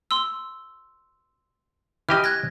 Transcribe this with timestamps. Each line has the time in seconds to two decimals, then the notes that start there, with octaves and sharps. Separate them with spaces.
0.11 C6 E6
2.09 E3 G4 D#5 F6
2.24 F#6 G#6 A#6